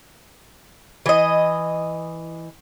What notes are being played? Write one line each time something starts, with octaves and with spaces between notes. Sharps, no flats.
E3 D#5